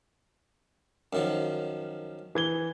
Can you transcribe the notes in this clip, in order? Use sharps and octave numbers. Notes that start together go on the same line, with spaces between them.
F#2 D#3 F3
E3 G#6 G7